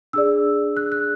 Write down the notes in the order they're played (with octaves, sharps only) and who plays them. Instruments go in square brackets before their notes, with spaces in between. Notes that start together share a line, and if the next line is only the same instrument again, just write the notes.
[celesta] D4 G#4 D5 E6
F#6
F#6